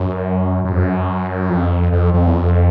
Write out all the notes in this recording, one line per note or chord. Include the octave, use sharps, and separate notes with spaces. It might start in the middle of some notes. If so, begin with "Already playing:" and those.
Already playing: F#2
F#2
F2
F#2
F2
F2
F2
E2
F2